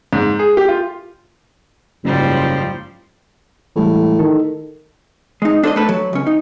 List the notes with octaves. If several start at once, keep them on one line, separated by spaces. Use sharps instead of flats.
G#2
G#4
G4
F4
F#1 G#2 F3 G3
A2 E3 G3 G#3
D#3 A4
G#3 D#4
D4 A4 C5 C#5 D#5
A3 A#3 A4 B4
F#3
C#2 C#4
D#4